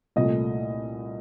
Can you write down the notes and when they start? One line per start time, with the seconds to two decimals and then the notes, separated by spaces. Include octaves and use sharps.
0.16 C2 A#2 A3 D#5